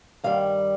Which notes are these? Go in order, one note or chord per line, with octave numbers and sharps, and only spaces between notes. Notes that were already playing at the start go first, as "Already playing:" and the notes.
G2 D#3 G3 F5